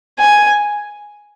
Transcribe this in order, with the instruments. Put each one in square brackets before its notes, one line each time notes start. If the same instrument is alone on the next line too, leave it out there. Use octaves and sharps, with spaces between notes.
[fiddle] G#5